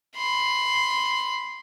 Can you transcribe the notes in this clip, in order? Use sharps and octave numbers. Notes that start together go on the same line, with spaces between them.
B5 C6